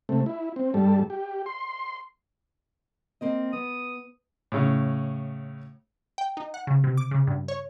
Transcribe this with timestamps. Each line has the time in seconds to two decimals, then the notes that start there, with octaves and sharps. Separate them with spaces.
0.09 C3 A3
0.26 E4
0.56 C4
0.74 G2 G3 A4
1.10 G4
1.46 C6
3.21 A#3 C4 D#5
3.53 B3 D#6
4.52 A2 C#3
6.18 G5
6.37 D#4
6.54 F#5
6.67 C#3
6.84 C3
6.97 D6
7.11 C#3
7.27 G2
7.48 C#5